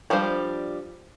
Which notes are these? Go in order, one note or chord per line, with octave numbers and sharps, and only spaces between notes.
F3 G3 D4 C5